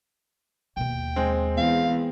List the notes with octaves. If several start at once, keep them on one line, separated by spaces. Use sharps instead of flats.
D#2 B2 G5
G#3 C4
E2 F5